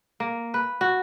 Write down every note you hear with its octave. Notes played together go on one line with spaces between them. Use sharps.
A#3
B4
F#4